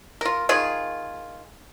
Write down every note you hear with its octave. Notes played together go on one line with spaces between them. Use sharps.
F4 A#4
D#3 F4 G#4